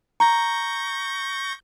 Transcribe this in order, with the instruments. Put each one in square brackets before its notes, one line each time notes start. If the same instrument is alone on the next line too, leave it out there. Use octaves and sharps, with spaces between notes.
[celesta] A#5 [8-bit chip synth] C#6 G6 A#6